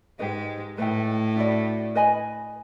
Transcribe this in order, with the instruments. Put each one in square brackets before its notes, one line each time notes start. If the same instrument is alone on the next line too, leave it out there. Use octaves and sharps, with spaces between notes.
[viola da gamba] G#2 G#3 [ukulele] D#4 G4 B4 D#5
[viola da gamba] A2 A3 [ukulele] B4 D#5 G5
[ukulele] D4 F#4 B4 D5
B4 D#5 G#5 B5